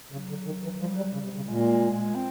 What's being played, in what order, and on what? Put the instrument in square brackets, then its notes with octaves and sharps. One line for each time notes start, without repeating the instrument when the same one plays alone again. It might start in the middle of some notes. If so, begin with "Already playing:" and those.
[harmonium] C#3 [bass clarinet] F#3
[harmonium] D3
D#3
E3
[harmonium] F3 [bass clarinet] G3
[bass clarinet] F#3 [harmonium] G3
[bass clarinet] G3
[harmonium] C#3
C3
C#3
[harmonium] A#2 [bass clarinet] G#3
[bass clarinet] C4